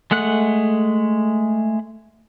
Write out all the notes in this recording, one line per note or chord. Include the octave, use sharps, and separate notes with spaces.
G#3 A3 F#5 F#6